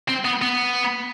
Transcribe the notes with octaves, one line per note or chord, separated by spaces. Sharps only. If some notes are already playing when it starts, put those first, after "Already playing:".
C4
B3
B3